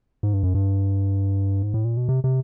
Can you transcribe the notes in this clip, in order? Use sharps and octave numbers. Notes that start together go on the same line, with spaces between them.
G#2
G2
F#2
G2
G#2
A2
A#2
B2
C3
C3